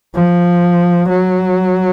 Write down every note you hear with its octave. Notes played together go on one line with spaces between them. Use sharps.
F3
F#3